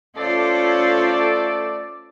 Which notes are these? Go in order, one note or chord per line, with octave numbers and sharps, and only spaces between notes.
A3 C#4 F4 A4 C5 D5